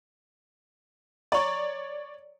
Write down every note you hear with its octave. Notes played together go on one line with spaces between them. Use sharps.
C#5 D5 A#5 C#6